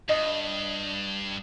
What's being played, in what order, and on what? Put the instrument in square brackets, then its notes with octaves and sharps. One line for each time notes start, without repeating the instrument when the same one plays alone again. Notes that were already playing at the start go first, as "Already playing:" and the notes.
[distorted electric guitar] G2 [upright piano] D#5